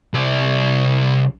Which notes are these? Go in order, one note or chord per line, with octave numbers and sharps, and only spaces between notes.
C2 D5